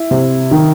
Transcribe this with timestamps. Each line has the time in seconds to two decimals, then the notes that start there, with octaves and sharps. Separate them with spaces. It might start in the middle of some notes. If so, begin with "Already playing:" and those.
Already playing: E4
0.11 C3
0.51 D#3